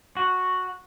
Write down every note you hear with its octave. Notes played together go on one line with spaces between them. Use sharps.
F#4